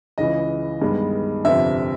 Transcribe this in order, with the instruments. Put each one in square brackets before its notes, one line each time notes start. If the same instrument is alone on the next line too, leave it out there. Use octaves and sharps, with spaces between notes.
[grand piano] C#2 C#3 E3 D#5
G2 D#3 G#3 B3
G1 F2 C3 E5